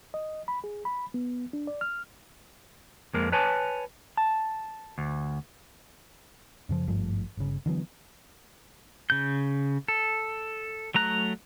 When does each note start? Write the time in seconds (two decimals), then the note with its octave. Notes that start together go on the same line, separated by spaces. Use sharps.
0.14 D#5
0.48 B5
0.64 G#4
0.85 B5
1.14 B3
1.53 D4
1.67 D5
1.81 F6
3.14 F2 G#3 A#3
3.32 B4 C#5 G#5 A5
4.17 A5
4.98 D2
6.69 F#2 C#3 F3
6.87 G#1 G2 F3 A3
7.37 G1 C#3
7.66 D3 E3 F#3 B3
9.10 C#3 G6
9.88 A4
10.94 F#3 A3 A#5 F#6